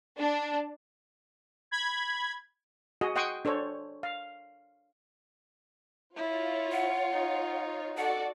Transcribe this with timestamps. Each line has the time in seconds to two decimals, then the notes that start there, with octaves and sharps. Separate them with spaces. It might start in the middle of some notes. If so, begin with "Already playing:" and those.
0.20 D4
1.71 B5 G#6
3.01 F#4 G#4 D#5
3.16 D#5 F#5 G5 C6 C#6 D#6
3.45 D4 A4 C5 C#5
4.03 F5
6.16 E4 F4 C#5
6.72 F#5
7.11 D#4
7.97 F#4 A4 D5 F#5